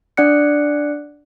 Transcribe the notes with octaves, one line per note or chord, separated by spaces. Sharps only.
D4 D5 F#5 F#6 C#7